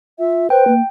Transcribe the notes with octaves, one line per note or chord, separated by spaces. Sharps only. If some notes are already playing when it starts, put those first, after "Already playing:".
F4 E5
B4 C5 G5
A#3